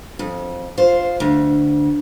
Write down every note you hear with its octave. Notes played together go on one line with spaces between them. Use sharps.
F2
F4 C5
D2